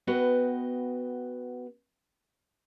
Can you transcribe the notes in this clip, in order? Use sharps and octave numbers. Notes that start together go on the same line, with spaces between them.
B3 F#4 B4 D#5 G5